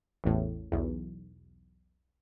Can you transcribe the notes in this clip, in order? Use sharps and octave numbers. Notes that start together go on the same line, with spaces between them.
A1 E2 A2
B1 E2